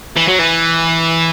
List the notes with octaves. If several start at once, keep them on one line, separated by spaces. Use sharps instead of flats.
E3
F#3
E3